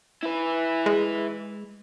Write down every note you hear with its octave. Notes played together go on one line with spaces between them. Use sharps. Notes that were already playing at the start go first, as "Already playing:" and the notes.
E4 B4
G#3